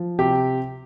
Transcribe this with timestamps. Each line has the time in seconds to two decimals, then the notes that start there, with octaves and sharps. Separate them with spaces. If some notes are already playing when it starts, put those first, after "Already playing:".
Already playing: F3
0.19 C3 G4